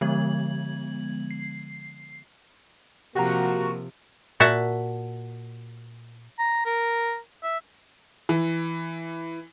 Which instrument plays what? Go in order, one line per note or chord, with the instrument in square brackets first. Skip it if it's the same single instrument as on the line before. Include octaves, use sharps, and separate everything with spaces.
[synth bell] D3 F3 G#3 B3 G#6 F#7
C7
[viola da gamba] C3 F3 [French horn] A#3 [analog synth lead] F#4 [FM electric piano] G4 F#5 A#5
[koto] A#2 F#4 E5 F#5 A5
[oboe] A#5
A#4
E5
[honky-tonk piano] E3